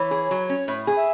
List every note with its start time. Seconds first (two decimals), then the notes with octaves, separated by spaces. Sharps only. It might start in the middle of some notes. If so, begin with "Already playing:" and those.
Already playing: E3 C#5
0.11 G#4
0.31 F#3
0.49 C#4
0.68 A2
0.87 G#4
0.97 E5